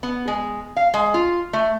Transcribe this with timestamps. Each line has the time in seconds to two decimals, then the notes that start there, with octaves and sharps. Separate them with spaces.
0.03 B3
0.28 G#3
0.77 F5
0.94 G#3
1.14 F4
1.53 A3